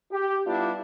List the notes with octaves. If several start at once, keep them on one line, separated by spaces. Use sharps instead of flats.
G4
G3 B3 D4 E4 F4